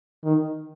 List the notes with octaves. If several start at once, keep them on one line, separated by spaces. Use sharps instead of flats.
D#3